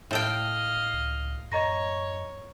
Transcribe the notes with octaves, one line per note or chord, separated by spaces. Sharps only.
A2 A4 D#5 F5 G5
C#2
F#2 C#5 D#5 A#5 A#6